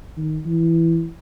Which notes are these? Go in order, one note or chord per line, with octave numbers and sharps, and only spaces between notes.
D#3
E3